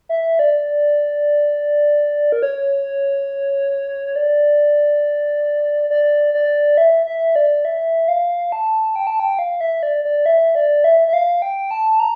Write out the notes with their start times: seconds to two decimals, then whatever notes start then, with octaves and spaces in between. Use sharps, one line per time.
0.09 E5
0.39 D5
2.32 A#4
2.42 C#5
4.16 D5
5.90 D5
6.34 D5
6.77 E5
7.06 E5
7.36 D5
7.65 E5
8.08 F5
8.52 A5
8.96 G5
9.07 A5
9.20 G5
9.39 F5
9.61 E5
9.83 D5
10.05 D5
10.26 E5
10.55 D5
10.84 E5
11.08 E5
11.13 F5
11.42 G5
11.71 A5
12.00 A#5